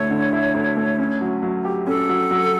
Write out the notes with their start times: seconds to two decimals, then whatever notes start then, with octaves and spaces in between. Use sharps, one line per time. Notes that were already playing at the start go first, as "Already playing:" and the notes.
Already playing: D2 D3 A3 E4 C#5
0.10 D3
0.33 E4
0.55 D2
0.77 A3
0.99 C#4
1.21 F#3
1.43 F#3
1.65 G4
1.87 C#4 A4
2.09 F#3
2.31 F#3